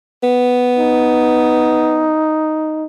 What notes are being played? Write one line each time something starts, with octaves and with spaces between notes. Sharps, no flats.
B3
D#4